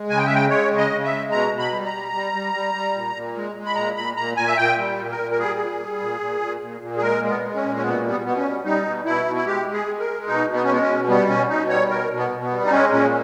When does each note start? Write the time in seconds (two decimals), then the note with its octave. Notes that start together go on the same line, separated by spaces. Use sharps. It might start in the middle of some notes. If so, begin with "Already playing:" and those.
Already playing: G#3
0.10 C#3 G#5
0.18 G5
0.26 G#3 E5
0.35 G5
0.50 G#3 C#5
0.70 C#3
0.78 D#5
0.91 C#3
1.05 E5
1.11 G#3
1.32 B2 A#5
1.52 B2
1.59 B5
1.72 G3
1.86 A#5
1.92 G3
2.13 G3
2.33 G3
2.54 G3
2.74 G3
2.94 A#2
3.15 A#2
3.36 G#3
3.56 G#3
3.66 B5
3.75 A#2 A#5
3.96 A#2 B5
4.17 A#2 A#5
4.37 A#2 G#5
4.47 E5
4.57 A#2 G5
4.77 G3
4.98 A#2
5.12 A#4
5.18 A#2
5.32 A#4
5.39 G3 G#4
5.59 A#2
5.79 G3
5.99 A#2
6.20 A#2
6.41 A#2
6.61 A#2
6.81 A#2
6.97 G#4
7.02 G#3 A#4
7.22 G#3
7.29 B3
7.42 G#3
7.55 C#4
7.62 A#2
7.76 C#4
7.82 B2 B3
8.03 G3
8.10 B3
8.23 B2 B3
8.37 C#4
8.44 G3
8.64 G3 D#4
8.85 B2
9.05 B2 E4
9.25 B2
9.36 E4
9.45 G#3 G4
9.66 G#3
9.73 G#4
9.87 G#3
10.00 A#4
10.07 G#3
10.27 B2 D#4
10.47 B2
10.54 B3
10.63 C#4
10.68 G#3 B3
10.82 C#4
10.88 B2
11.08 G3 B3
11.28 B2 C#4
11.49 B2 D#4
11.69 G3 C#5
11.89 B2 A#4
12.10 B2
12.17 B3
12.31 B2
12.44 B3
12.51 G3
12.66 D#4
12.71 G#3 C#4
12.92 A#2 C#4